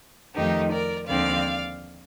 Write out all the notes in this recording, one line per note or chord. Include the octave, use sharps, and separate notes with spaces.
F2 D#3 A3 D#4 G4
A#4 D5
D#2 D3 F3 C4 D5 F5